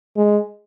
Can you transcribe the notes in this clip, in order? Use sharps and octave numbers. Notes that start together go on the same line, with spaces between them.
G#3